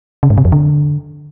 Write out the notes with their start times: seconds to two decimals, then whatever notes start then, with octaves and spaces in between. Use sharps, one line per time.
0.23 C#3
0.30 G#2
0.38 C3
0.45 F2
0.52 D3